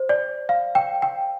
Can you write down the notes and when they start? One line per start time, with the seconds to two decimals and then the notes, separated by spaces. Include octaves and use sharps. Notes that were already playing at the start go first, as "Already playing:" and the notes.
Already playing: C5
0.09 D5
0.49 F5
0.75 G5
1.02 G5